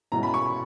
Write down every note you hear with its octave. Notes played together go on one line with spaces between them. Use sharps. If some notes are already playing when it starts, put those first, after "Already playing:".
B2 G#3 C#4 E4 A#5
B5
C#6